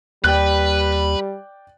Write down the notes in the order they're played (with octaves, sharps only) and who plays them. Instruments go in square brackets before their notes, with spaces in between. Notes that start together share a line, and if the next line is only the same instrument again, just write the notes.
[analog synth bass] D#2 [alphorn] G3 [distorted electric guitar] B4 [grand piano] D5 G5 F#6